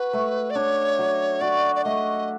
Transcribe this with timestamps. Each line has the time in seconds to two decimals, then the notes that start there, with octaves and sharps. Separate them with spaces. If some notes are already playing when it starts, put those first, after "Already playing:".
Already playing: F#4 B4
0.13 A3
0.50 D5
0.55 D4 C#5
0.99 F#3
1.41 F#4 D5
1.76 D5
1.84 A3 D#5